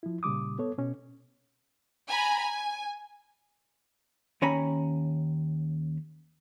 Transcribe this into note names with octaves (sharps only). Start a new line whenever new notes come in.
F3 E4
A#2 C#3 G3 D6 D#6
B3 A4 C#5
B2 C#4
G#5 A#5 B5
G#5
D#2 C#4 C#5 G#5 A#5 B5